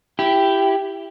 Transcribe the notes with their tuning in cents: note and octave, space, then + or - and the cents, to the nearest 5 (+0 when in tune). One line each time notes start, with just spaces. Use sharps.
E4 +15 G4 +0